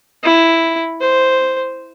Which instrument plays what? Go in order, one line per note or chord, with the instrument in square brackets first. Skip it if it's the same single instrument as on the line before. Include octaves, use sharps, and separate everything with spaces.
[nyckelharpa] E4
C5